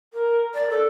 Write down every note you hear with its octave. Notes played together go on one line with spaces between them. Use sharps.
A#4
D5
A4